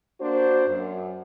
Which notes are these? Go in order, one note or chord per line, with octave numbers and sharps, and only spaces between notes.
A#3 D4 F#4 C5
F#2